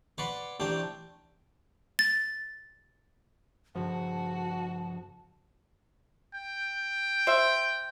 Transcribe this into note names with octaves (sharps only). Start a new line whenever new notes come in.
B4 C#5 D5 F#5 B5 C6
A1 A3 C4 D4 G4 G5
A6
G2 C#3 F3 F#4 A5
G5
C5 E5